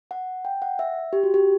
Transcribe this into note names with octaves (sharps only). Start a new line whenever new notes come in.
F#5
G5
F#5
E5
G4
F#4
G4